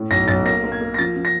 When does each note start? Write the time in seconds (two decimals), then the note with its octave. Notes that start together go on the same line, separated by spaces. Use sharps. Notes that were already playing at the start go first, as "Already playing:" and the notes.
Already playing: A2
0.11 B1 A#6
0.28 B1 A6
0.45 A#3 A#6
0.64 A#3
0.72 G#6
0.81 A#3
0.94 A#6
0.98 F3 A6
1.16 F3
1.25 A#6